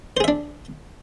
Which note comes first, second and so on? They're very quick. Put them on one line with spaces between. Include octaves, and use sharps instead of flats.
C5 G#4 E5 D4